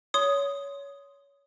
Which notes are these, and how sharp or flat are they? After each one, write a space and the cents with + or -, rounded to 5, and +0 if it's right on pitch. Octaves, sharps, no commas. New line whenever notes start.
C#5 +20 C6 +0 D#6 +0